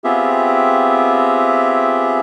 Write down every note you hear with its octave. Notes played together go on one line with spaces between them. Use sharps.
B3 C4 F4 G4 G#4 E5